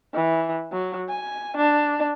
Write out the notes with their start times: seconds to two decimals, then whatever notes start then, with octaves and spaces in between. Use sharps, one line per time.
0.14 E3
0.72 F#3
1.09 G#5
1.57 D4